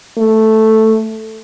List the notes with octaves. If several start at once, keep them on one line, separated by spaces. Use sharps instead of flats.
A3